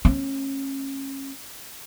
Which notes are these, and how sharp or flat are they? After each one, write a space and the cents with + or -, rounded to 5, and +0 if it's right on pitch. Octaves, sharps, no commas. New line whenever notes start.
A3 +0 C#4 -30